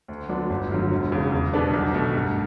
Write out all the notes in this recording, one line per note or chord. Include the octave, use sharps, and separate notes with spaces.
D2
D3 F#3 B3 D4
G1
G2 D3 F#3
E1
E2 C#3
E2
B2 G3 B3 D4
B1
B2 A3
G2